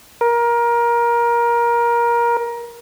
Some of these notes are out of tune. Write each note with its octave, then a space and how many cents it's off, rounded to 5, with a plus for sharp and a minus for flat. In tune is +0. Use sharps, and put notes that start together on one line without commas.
A#4 +20